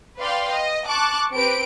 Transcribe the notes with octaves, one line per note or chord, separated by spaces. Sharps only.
B4 D5 F5 G5 C6
D#5
A5 C#6 D6 F#6
C4 G4 B4 D7